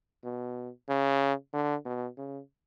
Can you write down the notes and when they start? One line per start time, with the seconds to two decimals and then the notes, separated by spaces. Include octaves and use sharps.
0.24 B2
0.89 C#3
1.53 D3
1.85 B2
2.18 C#3